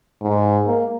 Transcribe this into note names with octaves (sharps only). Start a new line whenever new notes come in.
G#2
A#3